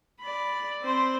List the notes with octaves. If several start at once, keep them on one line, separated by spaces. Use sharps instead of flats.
D5 B5
C4 C5